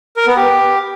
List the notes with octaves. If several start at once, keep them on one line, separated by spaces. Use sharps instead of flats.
A#4
B3
G4